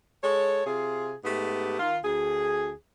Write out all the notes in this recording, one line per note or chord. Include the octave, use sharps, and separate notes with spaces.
G#3 A4 C#5
C3 F4 G#4
G#2 A3 B3 G4
D#3 F4
D2 G#4